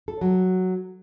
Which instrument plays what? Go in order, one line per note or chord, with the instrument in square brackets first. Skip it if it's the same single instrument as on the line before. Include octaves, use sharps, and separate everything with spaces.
[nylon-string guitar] A4
F#3